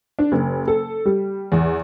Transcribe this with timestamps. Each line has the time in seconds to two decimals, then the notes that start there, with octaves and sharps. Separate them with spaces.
0.19 D4
0.32 F#1
0.68 A4
1.05 G3
1.52 E2